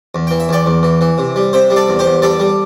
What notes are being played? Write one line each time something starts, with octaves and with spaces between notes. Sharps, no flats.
E2
E3 G5
E5
E2 D5 G5
E2
E3
E3
C3
G3
C3 C5 E5
G3
A4 D5
E2
G4 C5
E2
G3 A4 D5
G3